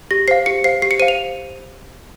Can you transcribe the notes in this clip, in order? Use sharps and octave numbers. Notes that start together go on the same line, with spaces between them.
G4 A#6
C5 F5 C7
G4 C#7
C5 F5 C7
G4 C7
C#7
C5 F5 D#7
F7